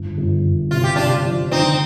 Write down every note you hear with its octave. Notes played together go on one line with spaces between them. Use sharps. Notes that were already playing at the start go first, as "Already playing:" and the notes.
Already playing: G1
G1
G1
C3 F4
G4
C3 D4 F4
F3
D3 C4 D#4